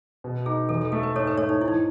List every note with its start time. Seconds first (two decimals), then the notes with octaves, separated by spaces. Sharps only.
0.24 B2
0.46 D#4 G#4
0.69 E2 A4
0.81 A4
0.92 A3 A4
1.03 B4
1.15 G#2 A4 C#5
1.27 B4
1.38 A3 A4 C#5
1.49 D#4
1.60 G#2 E4
1.68 D#4